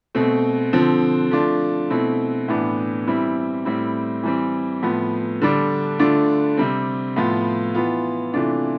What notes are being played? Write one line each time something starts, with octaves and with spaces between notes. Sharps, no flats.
B2 A3 C4
D3 F3 C4
F3 A3 D4 F4
B2 A3 C4 E4
A2 E3 B3 D4
E3 G3 C4 E4
A2 G3 C4 E4
E3 G3 C4
A2 F3 B3
D3 G3 D4
D3 A3 D4 F4
C3 G3 C4
A2 F3 B3 F4
E3 B3 F4
C3 E3 A3 D4 F4